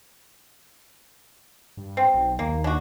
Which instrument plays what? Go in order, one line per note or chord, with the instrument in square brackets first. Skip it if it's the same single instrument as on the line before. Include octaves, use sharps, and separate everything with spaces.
[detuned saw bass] G2
[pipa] C4
[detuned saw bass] B1
[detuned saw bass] D#2 [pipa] A#3
[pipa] D4 F#4